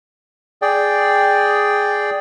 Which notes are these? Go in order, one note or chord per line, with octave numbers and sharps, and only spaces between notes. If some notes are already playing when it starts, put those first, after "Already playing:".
G#4 D5 G5